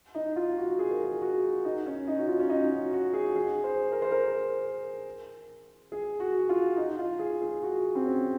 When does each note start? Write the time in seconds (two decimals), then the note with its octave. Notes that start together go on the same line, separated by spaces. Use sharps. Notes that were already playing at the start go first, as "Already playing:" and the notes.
0.15 D#4
0.36 F4
0.58 F#4
0.79 G#4
0.91 A#4
1.04 G#4
1.22 F#4
1.65 D#4
1.86 C#4
2.08 D#4
2.18 F#4
2.28 F4
2.39 C#4
2.50 D#4
2.71 F#4
2.93 F#4
3.13 G#4
3.36 G#4
3.64 C5
3.92 A#4
4.02 C5
4.11 A#4
5.92 G#4
6.20 F#4
6.49 F4
6.77 D#4
6.99 F4
7.19 G#4
7.42 G#4
7.63 F#4
7.95 C4
8.05 C#4